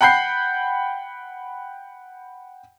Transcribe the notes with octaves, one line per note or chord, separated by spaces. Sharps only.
F#5 G5 B5 G6 C7